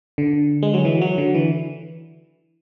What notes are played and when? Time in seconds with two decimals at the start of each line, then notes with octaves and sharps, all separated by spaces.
0.18 D3
0.63 G#3
0.74 F#3
0.85 E3
1.01 F#3
1.18 D3
1.35 E3